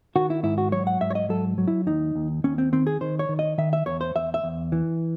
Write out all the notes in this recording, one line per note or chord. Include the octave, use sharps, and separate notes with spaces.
D#3 F#4
E4
G#2 E4
F#4
F#3 C#5
F#5
G#2 E5
C#5
D#5
F#3 A4
F#3
E4
D#2 D#4
D#2
D#2 C#4
C4
D#3 C4
G#4
D#3 C5
C#5
D#3
D#5
D#3 E5
E5
E2 C#5
C5
E2 E5
E5
E2
E3